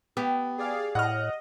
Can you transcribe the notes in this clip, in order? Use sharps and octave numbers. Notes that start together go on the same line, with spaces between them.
B3 G4
G#4 D5 F5
A2 D#5 F#5 F6